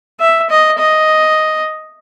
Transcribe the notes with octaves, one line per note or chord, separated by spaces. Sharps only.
E5
D#5
D#5